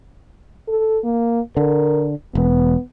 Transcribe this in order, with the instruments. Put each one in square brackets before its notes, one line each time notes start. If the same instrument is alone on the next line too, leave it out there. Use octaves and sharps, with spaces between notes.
[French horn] A4
A#3
[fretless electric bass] D3 [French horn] A#4
[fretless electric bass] E1 [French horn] B3